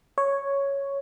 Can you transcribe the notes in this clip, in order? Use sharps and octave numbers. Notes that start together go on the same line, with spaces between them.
C#5